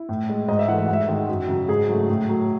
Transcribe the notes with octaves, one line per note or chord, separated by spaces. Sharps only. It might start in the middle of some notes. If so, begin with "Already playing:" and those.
Already playing: E4
A2
G#3
G#2 D#5
E5
E3 A3 F#5
E5
F#5
G#2 E5
D#3 G#3
F#2
C#3 F#3
G#2 G#4
F#3 A3
A2
F#3 A3